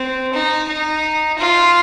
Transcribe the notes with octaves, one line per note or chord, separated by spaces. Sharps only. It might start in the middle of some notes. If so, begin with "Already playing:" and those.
Already playing: C4
D#4
D#4
F4